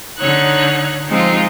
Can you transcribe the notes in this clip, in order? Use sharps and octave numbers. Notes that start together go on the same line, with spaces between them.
D3 D#4 C#5 F#6
F3 G#3 C4 D#4 F4 G#4